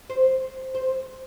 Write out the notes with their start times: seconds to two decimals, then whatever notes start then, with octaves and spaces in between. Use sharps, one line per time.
0.10 C5
0.75 C5